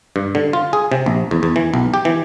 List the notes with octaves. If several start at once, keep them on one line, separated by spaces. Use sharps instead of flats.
G2
D3
F4
G#4
C3
A#1
E2
E2
E3
B1
G4
E3